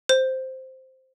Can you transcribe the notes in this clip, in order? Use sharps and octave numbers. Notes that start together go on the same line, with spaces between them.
C5